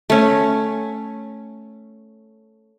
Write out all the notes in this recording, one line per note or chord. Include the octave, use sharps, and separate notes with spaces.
A3 C#4